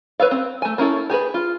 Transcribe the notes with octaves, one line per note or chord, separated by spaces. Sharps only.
B4 C#5 E5 F5
C4
A3 G#5
A#3 C#4 E4 A4
G4 G#4 A#4 B4
F4